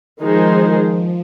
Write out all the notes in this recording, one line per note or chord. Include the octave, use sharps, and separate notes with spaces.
D#3 F3 G#3 D#4 G#4 C5